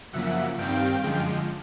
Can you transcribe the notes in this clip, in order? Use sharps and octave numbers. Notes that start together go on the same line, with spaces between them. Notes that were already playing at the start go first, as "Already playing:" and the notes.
F#2 C#3 F3 A#3 E5 F#5
G2 D#3 G3 C4 F5 G5
F#2 D3 F3 G#3